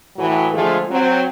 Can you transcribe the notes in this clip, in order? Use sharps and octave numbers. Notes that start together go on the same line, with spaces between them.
A2 E3 F#3
D3 F3 G#3 A3 F4 G#4
F#3 C4